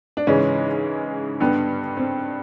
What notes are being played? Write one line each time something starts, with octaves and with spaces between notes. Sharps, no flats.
D4
G#2 C#3 E3 G#3 C#4
G2 D3 G3 B3
C4